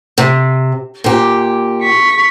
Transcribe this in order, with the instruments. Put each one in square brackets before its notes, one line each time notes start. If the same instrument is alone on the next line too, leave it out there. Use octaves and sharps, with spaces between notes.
[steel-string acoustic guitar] C3
A#2 G4
[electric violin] C#6 B6